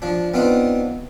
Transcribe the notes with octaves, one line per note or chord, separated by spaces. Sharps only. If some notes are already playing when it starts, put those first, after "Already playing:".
F3 D4
B3 C4 D4 D#4 F4